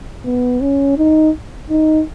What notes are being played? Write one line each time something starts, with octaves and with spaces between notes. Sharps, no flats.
B3
C#4
D#4
D#4